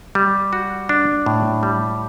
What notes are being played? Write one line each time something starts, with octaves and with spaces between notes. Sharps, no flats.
G3
F#4
D4
A2
G3